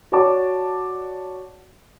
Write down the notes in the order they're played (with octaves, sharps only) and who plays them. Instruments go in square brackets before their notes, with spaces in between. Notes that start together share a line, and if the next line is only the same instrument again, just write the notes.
[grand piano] F#4 C#5 D5 F#5 A5 D6